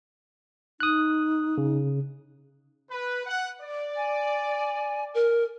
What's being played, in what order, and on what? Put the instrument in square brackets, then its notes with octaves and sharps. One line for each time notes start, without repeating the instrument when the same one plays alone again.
[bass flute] D#4 [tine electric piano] D#6 F#6
[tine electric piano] C#3
[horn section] B4
F#5
D5
[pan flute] G#5
A#4